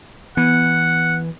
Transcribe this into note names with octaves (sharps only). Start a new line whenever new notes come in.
E3 B3 F#5